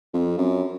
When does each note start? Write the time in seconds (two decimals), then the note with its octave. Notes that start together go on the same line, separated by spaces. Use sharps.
0.14 F2
0.38 F#2